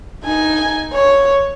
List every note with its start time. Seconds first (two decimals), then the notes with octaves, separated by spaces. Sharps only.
0.24 D#4 G#5
0.93 C#5